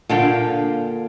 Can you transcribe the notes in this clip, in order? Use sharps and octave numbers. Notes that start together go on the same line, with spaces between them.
A#2 D3 F5 G5